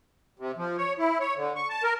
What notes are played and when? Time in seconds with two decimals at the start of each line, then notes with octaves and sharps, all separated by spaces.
0.39 C3
0.57 F3
0.78 C#5
0.99 E4
1.20 C#5
1.36 D3
1.56 C#6
1.69 A5
1.84 A#4